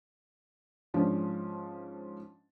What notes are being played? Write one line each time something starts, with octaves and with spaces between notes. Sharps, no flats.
G#2 F3 C#4 D4